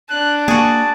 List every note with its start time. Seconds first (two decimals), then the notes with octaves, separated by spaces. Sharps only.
0.10 D4 F#6
0.48 A#3 F#4 G#4 A5